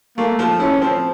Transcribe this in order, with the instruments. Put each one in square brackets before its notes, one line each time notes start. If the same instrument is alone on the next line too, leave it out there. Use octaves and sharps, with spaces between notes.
[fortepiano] A3 [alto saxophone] A#3
[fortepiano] F3
[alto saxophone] C#4 [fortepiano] E4
[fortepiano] F3 [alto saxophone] C4